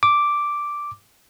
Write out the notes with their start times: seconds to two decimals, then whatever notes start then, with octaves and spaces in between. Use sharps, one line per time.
0.03 D6